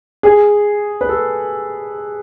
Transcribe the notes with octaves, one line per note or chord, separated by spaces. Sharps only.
G#4
B4
A4